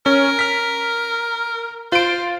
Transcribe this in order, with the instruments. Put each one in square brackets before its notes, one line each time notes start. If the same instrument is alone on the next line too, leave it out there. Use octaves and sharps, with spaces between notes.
[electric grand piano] C#4 [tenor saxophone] A#4
[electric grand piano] F6 B6
[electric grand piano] F4 D7 [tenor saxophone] C5